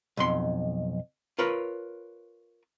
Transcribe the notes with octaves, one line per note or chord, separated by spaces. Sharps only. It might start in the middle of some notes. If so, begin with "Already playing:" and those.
B1 F2 C6
F4 A#4 B4 C#5